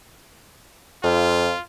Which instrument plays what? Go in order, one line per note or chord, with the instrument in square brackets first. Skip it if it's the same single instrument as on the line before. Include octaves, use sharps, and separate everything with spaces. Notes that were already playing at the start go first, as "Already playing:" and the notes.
[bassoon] F2 [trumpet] F4